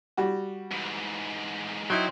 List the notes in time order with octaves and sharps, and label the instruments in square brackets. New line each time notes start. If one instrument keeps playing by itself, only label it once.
[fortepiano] G3 F#4
[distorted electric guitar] G#2 E3
[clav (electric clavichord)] F#3 D#4 E4 [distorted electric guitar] G5 C6